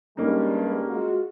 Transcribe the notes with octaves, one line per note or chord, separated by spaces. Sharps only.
G2 G3 G#3 A#3 C#4 D#4
G#3 F4 F#4